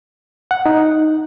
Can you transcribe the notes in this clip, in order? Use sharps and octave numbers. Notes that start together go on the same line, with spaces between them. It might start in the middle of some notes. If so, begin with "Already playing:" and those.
F#5
D#4